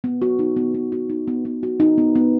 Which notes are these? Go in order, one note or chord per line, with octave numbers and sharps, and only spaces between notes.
B3
F#4
D#4
B3
B3
F#4
D#4
B3
B3
F#4
D#4
B3
B3